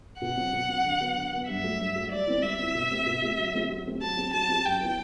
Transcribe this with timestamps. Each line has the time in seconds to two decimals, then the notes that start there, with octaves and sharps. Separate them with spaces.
0.21 B2 F#5
0.37 F#3 C4
0.53 B2
0.68 F#3 C4
0.84 D3
1.00 F#3 B3
1.16 D3
1.33 F#3 B3
1.48 G2 E5
1.64 F#3 A3
1.79 G2
1.96 F#3 A3
2.12 G3 D5
2.27 C4 E4
2.43 G3 E5
2.59 C4 E4
2.75 B2
2.91 A3 C4 G4
3.06 B2
3.22 A3 C4 G4
3.38 F#3
3.54 A3 C4 G4
3.69 F#3
3.86 A3 C4 G4
4.02 F#3 A5
4.17 C4 G4
4.34 F#3 A5
4.49 C4 G4
4.65 F#2 G5
4.80 F#3 B3 E4